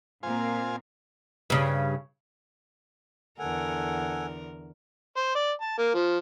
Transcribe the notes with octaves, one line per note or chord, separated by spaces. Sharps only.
A#2 A#3 C4 F4 C5 G#5
G2 C#3
E2 D3 A4 A#4 F#5 G#5
C5
D5
A5
A#3
F3